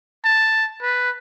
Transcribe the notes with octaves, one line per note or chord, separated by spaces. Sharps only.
A5
B4